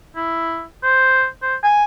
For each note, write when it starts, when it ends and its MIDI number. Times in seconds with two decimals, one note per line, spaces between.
0.16 0.63 64
0.83 1.26 72
1.42 1.55 72
1.64 1.85 80